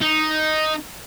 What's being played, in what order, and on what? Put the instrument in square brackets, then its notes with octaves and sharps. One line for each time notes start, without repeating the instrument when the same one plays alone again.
[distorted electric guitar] D#4